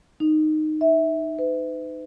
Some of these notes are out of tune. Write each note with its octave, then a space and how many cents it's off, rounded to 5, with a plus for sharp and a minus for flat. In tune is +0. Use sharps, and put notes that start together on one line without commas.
D#4 -10
E5 -15
B4 +45